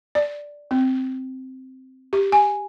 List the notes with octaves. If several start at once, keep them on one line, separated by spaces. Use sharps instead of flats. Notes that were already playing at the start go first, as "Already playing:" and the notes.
D5
C4
G4
G#5